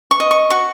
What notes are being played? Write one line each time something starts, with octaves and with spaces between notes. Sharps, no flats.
C#6
D#5
C#6
F#4 C#6